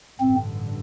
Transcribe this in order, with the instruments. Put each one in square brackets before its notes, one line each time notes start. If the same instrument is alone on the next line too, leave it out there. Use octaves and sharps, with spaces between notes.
[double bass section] A1 G2 D3 [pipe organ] C4